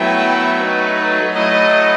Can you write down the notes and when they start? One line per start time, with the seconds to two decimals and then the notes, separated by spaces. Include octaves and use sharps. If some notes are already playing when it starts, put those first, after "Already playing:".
Already playing: F#3 A3 B3 E4 B4 E5 G5
0.60 D#4 F#4 B4
1.34 F#3 A3 E4 A4 D#5